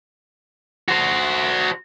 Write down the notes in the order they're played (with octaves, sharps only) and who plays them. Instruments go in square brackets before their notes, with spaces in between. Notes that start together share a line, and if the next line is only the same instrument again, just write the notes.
[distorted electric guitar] F#4 C5